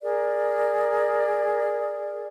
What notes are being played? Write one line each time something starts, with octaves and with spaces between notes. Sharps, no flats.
G#4 A#4 D5